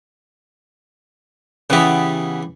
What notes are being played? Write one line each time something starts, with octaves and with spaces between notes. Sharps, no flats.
C#3 E3 B3 E4 G4